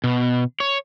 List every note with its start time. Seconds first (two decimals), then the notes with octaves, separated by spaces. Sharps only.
0.04 B2
0.60 C#5